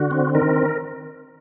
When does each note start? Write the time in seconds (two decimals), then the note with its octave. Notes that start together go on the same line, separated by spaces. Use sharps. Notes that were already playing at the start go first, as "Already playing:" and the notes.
Already playing: D3 F#4
0.11 C4
0.35 D#3 A#4